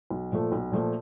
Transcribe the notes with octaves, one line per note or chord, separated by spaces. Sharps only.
B1
A#2 F3 A3
B1
A#2 F3 A3